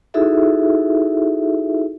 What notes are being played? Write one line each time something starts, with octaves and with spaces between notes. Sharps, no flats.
D#4 E4 F#4 G#4 A4 E5